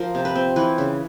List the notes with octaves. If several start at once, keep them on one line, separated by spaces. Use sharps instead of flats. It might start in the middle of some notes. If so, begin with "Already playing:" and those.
Already playing: F3 A#4
C3
B4
C4
E3 B4
C#3